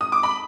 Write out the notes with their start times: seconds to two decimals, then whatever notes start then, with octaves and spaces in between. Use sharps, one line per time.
0.01 D#6
0.12 D6
0.23 B5